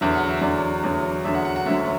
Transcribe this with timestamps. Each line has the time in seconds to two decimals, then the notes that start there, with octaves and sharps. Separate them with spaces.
0.01 E2 D3 F#3 E5
0.15 F#5
0.28 E5
0.41 E2 D3 F#3 D5
0.83 E2 D3 F#3
1.24 E2 D3 F#3 E5
1.35 F#5
1.45 F#5
1.56 F#5
1.66 D2 D3 F#3 E5